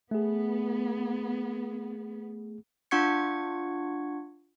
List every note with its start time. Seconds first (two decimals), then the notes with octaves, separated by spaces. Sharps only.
0.11 A3 B3 G#4
2.91 D4 F4 F#5 C#6 G#6 C#7